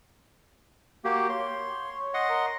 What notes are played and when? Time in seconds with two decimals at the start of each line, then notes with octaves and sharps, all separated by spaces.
1.04 A#3 F#4 G4
1.29 C#5 C6
2.14 D#5 F#5 C6
2.29 A#4